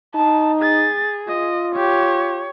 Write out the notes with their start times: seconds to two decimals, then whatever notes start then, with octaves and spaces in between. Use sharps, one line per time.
0.15 D#4 A5
0.62 G#4 A6
1.28 F4 D#5
1.76 G4 C#5